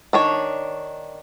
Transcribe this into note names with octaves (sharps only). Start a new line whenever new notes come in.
D#3 D4 C#5